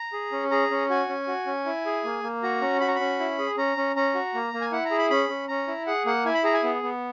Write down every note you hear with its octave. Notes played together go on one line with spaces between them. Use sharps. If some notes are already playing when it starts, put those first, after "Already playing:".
Already playing: A#5
G#4
C#4
G#4 A#5
C#4
F#4 G#5
C#4
F#4
C#4
E4
G#4
A#3
A#3
F#4 A#5
C#4
F#4 B5
A#5
C#4 B5
E4
G#4
C#4 A#5
C#4
C#4 A#5
F#4
A#3
A#3
G#5
E4 F#5
A#5
G#4
B5
C#4 B5
C#4
C#4 A#5
E4
G#4 F#5
A#3 F#5
E4 G#5
B5
G#4 A#5
G#5
B3
B3